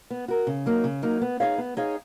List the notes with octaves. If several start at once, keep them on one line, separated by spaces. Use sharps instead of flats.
B3
F#4 A#4
C#3
F#3 A#3 D#4
C#3
F#3 A#3 D#4
B3
D#4 G#4 C#5 F5
B3
D#4 G#4 C#5 F5